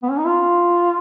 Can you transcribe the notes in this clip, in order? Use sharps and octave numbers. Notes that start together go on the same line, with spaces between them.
B3
C#4
D#4
F4